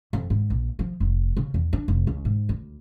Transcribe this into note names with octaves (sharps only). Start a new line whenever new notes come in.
F2
G#2
A#1
F3
F1
C#3
E2
D4
F1
C#2
G#2
D2